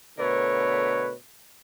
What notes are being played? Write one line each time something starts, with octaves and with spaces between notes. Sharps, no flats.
B2 D3 A3 A#4 B4 C#5